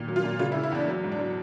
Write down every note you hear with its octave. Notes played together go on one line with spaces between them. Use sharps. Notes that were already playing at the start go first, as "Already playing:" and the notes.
Already playing: A#2 D#3
F#3
F4
A#2
C#3 F4
E4
C#3
E4
E2 D4
F#3
G#2
D4
F#3